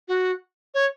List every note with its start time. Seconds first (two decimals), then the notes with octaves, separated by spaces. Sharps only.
0.08 F#4
0.74 C#5